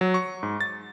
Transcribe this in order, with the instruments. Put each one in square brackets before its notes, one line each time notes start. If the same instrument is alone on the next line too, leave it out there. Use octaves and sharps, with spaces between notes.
[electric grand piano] F#3
C#6
G#2
A6